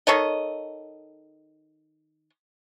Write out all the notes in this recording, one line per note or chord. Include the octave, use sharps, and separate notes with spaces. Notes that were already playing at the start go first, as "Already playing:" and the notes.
D#3 A4 C#5 D#5